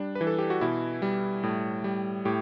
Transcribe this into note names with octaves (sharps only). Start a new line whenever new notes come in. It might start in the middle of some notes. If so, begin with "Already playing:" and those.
Already playing: G3 D4
B4
E3
A4
G4
F#4
B2 E4
G3
A2
G3
A2 G4